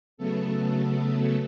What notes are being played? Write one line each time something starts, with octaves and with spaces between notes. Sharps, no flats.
C#3 F#3 A3 B3 A4